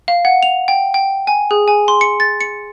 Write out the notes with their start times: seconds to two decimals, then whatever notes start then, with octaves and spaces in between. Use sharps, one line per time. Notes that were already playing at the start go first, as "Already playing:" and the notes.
0.08 F5
0.25 F#5
0.43 F7
0.68 G5
0.94 G5
1.27 G#5
1.51 G#4
1.68 G#5
1.88 C6
2.01 C#7
2.20 A6
2.41 C#7